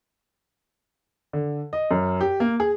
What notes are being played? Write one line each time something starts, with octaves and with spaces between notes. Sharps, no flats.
D3
D#5
F#2
G4
A#3
G#4